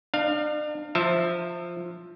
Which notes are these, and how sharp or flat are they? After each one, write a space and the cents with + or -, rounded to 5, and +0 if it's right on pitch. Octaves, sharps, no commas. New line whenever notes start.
D4 +40 F5 +0
F3 +0 E5 +0 A5 +40